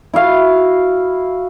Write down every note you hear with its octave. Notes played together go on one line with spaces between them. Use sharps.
E4 F#4 F5